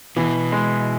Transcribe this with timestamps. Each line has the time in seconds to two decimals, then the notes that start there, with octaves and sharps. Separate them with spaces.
0.16 B2 E3
0.52 G#3